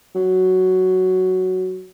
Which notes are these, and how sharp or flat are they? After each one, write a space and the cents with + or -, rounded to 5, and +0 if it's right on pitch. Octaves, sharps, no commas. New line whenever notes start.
F#3 +5